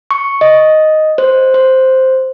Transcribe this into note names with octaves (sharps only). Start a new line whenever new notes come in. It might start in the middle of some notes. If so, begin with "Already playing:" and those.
C#6
D#5
C5
C5